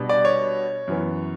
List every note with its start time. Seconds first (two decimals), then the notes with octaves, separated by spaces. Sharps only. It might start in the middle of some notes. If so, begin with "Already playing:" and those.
Already playing: B2 G3 B3 D4
0.09 D5
0.25 C#5
0.88 F#2 E3 B3